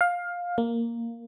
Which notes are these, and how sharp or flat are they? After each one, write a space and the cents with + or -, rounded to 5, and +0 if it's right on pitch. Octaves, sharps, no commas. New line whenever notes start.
F5 +15
A#3 -5